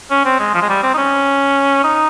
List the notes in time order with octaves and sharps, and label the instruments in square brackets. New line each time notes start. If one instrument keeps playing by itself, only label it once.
[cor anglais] C#4
C4
G#3
F3
G#3
G3
C4
D#4
C#4
D#4